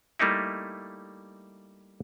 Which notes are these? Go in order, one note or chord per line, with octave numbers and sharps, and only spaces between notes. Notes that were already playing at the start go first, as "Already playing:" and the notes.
G3 A3 A#3 D#4 E4